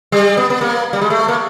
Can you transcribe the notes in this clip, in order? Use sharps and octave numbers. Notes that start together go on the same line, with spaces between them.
G3
B3
B3
A#3
G3
G#3
A3
A#3